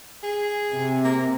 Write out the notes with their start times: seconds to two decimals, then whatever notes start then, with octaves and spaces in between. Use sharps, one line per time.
0.23 G#4
0.71 C3
1.04 A#3